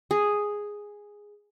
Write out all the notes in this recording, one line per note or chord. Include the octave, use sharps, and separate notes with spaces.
G#4